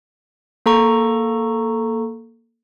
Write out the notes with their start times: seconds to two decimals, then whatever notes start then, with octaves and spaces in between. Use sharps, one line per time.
0.66 A#3 A4 A#5 C#6